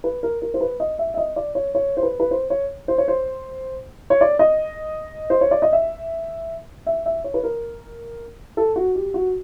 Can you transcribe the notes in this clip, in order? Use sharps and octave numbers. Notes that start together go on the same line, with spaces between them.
B4
A#4
A#4
C5
B4
D#5
E5
E5
D#5
D5
C#5
C#5
C5
B4
B4
C5
C#5
C5
C#5
C5
C#5
D5
D#5
C5
C#5
D5
D#5
E5
E5
E5
C#5
B4
A#4
A4
F#4
G4
F#4